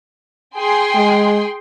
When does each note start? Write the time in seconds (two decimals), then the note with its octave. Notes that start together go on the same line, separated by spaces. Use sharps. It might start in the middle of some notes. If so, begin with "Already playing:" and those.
0.56 G#4 G5 C6
0.95 G#3